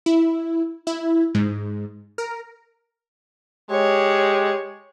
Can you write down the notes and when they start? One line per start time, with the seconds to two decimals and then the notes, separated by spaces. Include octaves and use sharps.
0.06 E4
0.87 E4
1.35 G#2
2.18 A#4
3.71 G#3 G4 C#5